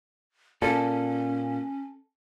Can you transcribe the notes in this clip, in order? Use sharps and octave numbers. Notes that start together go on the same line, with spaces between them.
A#2 C#4 A4